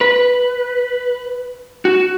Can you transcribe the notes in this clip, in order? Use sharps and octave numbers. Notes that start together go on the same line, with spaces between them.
B4
F#4